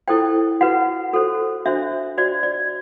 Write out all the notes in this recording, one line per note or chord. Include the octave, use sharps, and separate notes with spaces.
E4 A4 C5 G5
F#4 B4 F#5
F#4 A4 C5
D4 F#4 C5 E5
F#4 C5 D5
D5